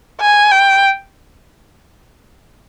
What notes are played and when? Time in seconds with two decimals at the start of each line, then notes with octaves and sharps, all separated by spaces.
0.21 G#5
0.51 G5